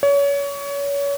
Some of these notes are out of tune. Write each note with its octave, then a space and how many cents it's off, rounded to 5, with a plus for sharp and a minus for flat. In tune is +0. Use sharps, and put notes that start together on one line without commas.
C#5 +30